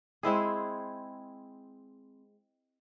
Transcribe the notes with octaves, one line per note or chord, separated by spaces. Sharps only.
G#3 C4 E4 G#4